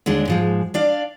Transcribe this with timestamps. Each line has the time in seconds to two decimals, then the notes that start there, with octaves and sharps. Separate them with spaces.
0.06 D#2 D3 G#3 D4
0.28 G#2 F3 G#3
0.74 D4 D5 F5